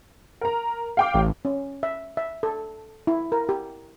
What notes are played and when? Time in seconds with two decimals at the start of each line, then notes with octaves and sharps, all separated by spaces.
0.41 A#4 A#5
0.97 F5 G5 D6
1.14 A1
1.45 C#4
1.83 E5
2.17 E5
2.43 A4
3.07 E4
3.32 A#4
3.49 G4